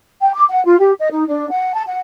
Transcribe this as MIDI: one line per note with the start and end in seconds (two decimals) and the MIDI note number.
0.20 0.31 79
0.34 0.43 86
0.48 0.62 78
0.63 0.76 65
0.78 0.91 67
0.99 1.09 75
1.11 1.26 63
1.27 1.47 62
1.50 1.73 78
1.73 1.82 81
1.87 1.99 78